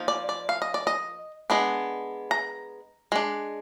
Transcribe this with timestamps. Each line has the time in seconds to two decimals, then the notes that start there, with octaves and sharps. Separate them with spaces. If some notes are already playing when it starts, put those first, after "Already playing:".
Already playing: F3 A#3 D#4
0.08 D5
0.29 D5
0.49 F5
0.62 D#5
0.74 D5
0.87 D#5
1.50 G#3 B3 D4
2.31 A#5
3.12 G#3 D4